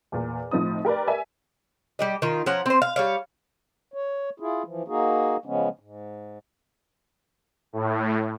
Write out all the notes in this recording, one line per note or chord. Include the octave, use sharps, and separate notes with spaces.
E2 A#2
A2 F3 C4 D#4 D#6
G4 A#4 B4 D5
E5 G#5
G3 G4 D#5
D#3 F4
F3 C#4 F#5 A#5
C4 C5
F5
G3 C#5 F5
C#5
E4 F4 G#4
E3 F3
A#3 D#4 F#4 G#4
C#3 F3 G#3 B3 C#4
G#2
A2